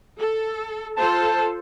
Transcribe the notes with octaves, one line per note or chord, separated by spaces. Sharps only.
A4
F4 A4 C5 A5